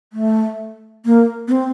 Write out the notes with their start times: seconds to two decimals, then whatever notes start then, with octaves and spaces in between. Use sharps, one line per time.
0.13 A3
1.05 A#3
1.48 B3
1.51 C4